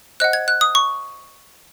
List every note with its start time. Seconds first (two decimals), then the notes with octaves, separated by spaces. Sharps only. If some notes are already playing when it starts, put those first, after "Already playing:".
0.20 C5 D#5 F#5 F#6
0.33 G#6
0.48 F#6
0.61 D#6
0.75 C#6